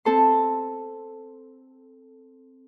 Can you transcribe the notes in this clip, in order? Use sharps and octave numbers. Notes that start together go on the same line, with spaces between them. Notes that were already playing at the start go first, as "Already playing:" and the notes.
C4 A4 C6